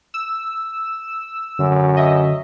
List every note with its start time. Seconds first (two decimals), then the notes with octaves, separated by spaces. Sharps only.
0.14 E6
1.59 F#2 D3
1.97 D#5 E5